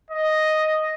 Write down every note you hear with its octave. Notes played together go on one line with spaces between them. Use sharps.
D#5